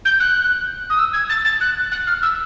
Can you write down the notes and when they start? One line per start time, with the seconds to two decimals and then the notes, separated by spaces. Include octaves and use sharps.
0.05 G6
0.20 F#6
0.90 D#6
0.99 E6
1.13 G#6
1.29 A6
1.45 A6
1.61 F#6
1.92 F#6
2.07 F6
2.23 E6